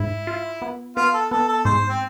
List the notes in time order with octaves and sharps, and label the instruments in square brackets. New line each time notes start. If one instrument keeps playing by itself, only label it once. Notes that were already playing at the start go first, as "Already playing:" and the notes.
Already playing: [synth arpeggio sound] G#2 [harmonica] E4
[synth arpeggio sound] F4
B3
[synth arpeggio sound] B3 [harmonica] F4
[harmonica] A4
[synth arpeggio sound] B3 [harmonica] A4
[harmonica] A4
[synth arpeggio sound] G#2 [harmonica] C5
[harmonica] C4